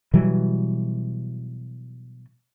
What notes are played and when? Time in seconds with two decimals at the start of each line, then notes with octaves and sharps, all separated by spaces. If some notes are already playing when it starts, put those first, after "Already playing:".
0.13 B2 E3 F#3 G3